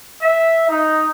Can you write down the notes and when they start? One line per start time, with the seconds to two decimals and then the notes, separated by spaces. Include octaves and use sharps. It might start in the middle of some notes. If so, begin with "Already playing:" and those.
0.22 E5
0.68 D#4